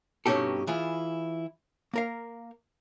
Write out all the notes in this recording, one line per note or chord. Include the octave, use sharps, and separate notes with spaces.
G2 B2 C#4 D#4 G4 A4
E3 E4 F4 G#4
A#3 A#4 F5